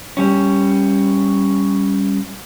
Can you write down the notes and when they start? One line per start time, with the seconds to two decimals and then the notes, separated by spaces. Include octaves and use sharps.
0.17 G3 C#4